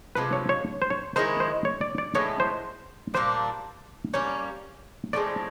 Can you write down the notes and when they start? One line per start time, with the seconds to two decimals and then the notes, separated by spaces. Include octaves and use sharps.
0.15 C3 F3 G#3 B4
0.33 C#5
0.49 C#5
0.82 C5
0.90 C#5
1.16 D#3 G#3 B3 E4 C5
1.40 C5
1.65 C#5
1.81 D5
1.98 D5
2.15 A2 E3 G#3 B3 C#5
2.40 C5
3.14 A#2 G3 A#3 D4 C5
4.14 G3 A#3 C#4 C#5
5.13 A2 F3 G#3 C4 D5